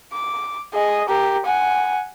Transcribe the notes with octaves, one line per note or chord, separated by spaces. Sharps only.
D6
G#4 D#5
G4 A#4
F#5 G#5